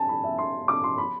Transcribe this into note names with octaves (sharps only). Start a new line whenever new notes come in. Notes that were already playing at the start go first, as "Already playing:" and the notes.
Already playing: G#5 A5
B5
E5
C6
D6
C6
B5